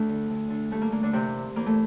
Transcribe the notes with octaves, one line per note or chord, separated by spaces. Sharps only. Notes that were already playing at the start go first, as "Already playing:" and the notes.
Already playing: D2 A3 D4
D3
D2
D3
G2 A3
A#3
D3 A#3
D3 D4
E2 C3 C4
D3
E2 A#3
A3